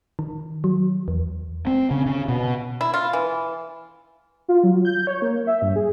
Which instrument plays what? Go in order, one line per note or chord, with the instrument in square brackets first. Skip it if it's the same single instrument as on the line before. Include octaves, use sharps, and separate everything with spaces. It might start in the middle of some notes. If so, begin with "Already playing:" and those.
[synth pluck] D#3
F#3
E2
[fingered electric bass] C4
C#3
C#3
B2
[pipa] E4
F4
E3
[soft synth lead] F4
F#3
G6
C#5
A#3
E5
G2
G#4